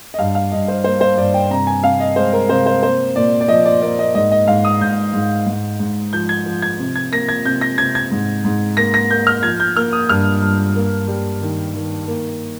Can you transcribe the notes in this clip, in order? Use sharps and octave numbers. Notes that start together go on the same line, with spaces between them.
D#5
G2 F5
F5
G2 D#5
C5
A#3 C5
C5
G2 D5
G5
C3 A#5
G#5
C3 F5
D#5
G#3 C5
A#4
C3 C5
C5
A#3 C5
A#2 D5
D5
F3 D#5
D5
A#3 D5
D#5
G#2 D#5
D#5
G#2 F5
D#6
G#2 G6
G#2
G#2
G#2
F3 G6
G#6
F3
G#6
C3
G#6
A#3 A#6
G#6
C3 G6
A#6
C3 G#6
G#6
G#2
G#2
A#3 A#6
A#6
A#3 G6
F6
F3 G#6
G6
A#3 F6
D#6
G2 F6
G2
A#3
G3
D#3
D#3
A#3